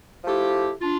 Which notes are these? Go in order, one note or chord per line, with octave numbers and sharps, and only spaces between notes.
F3 A3 E4 G4
D4 F4